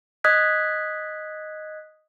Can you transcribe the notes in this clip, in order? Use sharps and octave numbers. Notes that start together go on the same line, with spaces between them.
D#5 D#6 F#6 G#6 B6